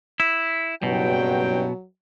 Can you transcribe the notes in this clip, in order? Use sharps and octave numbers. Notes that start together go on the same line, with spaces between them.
E4
F#1 G2 B2 F#3 G5